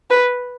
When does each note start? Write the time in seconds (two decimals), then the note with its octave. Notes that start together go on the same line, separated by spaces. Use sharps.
0.10 B4